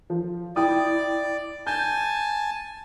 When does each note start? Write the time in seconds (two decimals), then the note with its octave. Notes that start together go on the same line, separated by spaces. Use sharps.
0.10 F3
0.56 E4 D5 G5 D#6
1.67 G#5 A5 G6